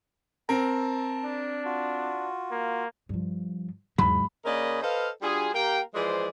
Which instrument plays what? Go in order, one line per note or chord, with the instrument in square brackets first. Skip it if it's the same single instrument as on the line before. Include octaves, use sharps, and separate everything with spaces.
[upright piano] C4 A#4 [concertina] A5
[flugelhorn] D4
[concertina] F4 F#4
[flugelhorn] A#3
[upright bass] G2 F3
[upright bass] E2 C#3 [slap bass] G#2 F#3 G#3 [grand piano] B5
[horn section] C#3 A#3 A#4 D5 D#5 B5
A4 B4 C5 D#5 F5
G3 D4 F4 F#4 G#4
A#3 G4 A#4 F5 G5
E3 F3 G#3 G#4 C5 D5